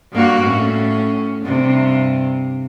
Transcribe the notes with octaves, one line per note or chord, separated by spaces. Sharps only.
G2 A#3 F#4
A2 C#4
G2 C3